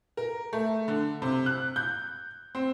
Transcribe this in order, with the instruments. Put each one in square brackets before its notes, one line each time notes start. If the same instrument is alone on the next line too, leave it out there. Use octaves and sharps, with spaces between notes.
[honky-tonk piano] A#4
A3
D3
C3
F#6
G6
C4